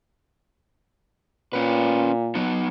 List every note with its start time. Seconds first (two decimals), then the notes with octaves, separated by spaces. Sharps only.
1.53 A#2 C#4 B4
2.35 F#3 B3 D#4